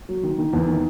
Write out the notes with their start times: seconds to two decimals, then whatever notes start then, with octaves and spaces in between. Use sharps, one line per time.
0.09 F#3
0.23 D#3
0.38 D#3
0.53 E2
0.68 D#3